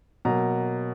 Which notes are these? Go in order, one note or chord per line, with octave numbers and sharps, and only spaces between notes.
B2 F#3 A#3 A#5